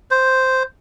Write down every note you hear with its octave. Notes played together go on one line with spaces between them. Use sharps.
C5